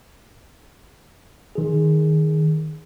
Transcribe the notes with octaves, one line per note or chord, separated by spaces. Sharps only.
D#3 G#4